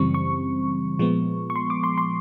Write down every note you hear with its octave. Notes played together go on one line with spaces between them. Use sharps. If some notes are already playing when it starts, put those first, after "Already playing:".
Already playing: F#2 C#3 E3 G3 C4 C#6
C#6
A#2 F3 G#3 B3
C#6
C6
D6
C6
C6